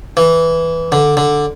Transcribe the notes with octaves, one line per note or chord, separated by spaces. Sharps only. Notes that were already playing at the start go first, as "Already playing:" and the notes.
E3
D3
D3